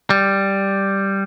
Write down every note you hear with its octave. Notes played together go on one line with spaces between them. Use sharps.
G3